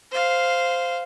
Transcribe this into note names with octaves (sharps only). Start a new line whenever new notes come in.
C5 F5